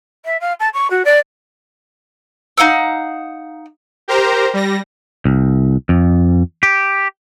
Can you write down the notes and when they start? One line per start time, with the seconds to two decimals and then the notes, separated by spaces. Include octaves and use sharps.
0.25 E5
0.40 F5
0.60 A5
0.74 C#6
0.90 F#4
1.05 D5
2.58 D#4 F5 F#5 E6
4.08 G4 A#4 C5 A#5
4.54 G3 A#6
5.25 C2
5.89 F2
6.63 G4